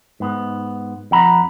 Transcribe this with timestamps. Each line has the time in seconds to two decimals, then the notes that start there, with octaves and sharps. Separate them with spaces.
0.20 G#2 B3
1.11 F2 F#5 A#5 B5